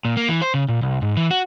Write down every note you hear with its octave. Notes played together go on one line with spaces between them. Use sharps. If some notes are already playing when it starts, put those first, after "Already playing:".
A#2
A#3
E3
C5
C#3
A#2
C2
G#2
E3
F#4